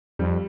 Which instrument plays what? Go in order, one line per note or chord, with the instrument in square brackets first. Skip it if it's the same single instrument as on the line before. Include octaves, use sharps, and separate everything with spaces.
[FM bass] F2 [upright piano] G3